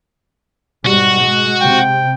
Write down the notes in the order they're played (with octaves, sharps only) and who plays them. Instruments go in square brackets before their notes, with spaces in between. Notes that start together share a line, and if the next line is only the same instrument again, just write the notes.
[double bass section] G#2 B2 G3 [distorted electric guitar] F#4
[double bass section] G#3
[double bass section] C3 [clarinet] G5